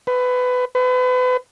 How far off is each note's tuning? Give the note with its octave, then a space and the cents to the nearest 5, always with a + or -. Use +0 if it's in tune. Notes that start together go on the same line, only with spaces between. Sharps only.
B4 +20
B4 +35